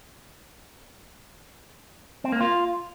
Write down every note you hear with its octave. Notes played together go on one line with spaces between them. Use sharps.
C4
A#3
F4